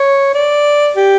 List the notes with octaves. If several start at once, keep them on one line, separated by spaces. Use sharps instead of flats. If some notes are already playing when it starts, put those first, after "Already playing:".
Already playing: C#5
D5
G4